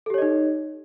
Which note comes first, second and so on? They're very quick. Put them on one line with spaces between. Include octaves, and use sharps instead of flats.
A4 G4 C#5 D#5 D#4